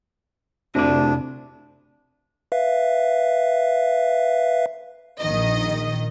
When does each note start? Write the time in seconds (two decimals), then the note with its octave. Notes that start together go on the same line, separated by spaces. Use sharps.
0.75 F1 D2 C3 D4 D5
2.52 B4 E5 F5
5.21 A#1 D#3 D#5